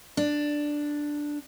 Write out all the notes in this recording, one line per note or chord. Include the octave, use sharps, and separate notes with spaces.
D4